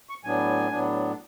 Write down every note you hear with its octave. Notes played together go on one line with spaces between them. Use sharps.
C#6
A2 F#3 B3 D4 G#5
A2 F#3 B3 D4